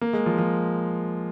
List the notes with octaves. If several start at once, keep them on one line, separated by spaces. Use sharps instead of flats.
A#3
G#3
F3
F3